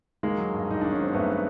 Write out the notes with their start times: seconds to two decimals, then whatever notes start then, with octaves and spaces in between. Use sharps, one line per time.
0.23 D#3 G#3 A#3
0.38 F#3
0.53 G2
0.68 G2 D#4
0.81 D#3 D4
0.92 C#4
0.99 F#3 C4
1.13 G2 A3 B3
1.30 B3